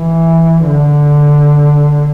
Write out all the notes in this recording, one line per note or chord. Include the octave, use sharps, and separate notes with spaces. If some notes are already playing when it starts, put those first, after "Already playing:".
Already playing: E3
D3